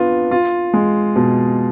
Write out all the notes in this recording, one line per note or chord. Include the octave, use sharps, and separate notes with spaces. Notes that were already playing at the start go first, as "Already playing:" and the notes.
Already playing: B3 D4 F4
F4
G#3
B2